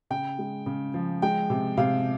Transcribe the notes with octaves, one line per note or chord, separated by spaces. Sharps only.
C#3 G5
G#3
C#3
F3
G#3 G5
C3
C3 F5